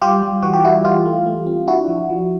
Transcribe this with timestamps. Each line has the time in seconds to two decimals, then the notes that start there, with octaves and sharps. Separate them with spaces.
0.02 G3 F4 G4
0.22 G3
0.42 E3 F#4
0.53 G4
0.64 G3 E4 F#4
0.84 E3 F4 G4
1.05 A3
1.26 A3
1.46 C4
1.68 D4 E4 F#4
1.88 F3
2.10 F3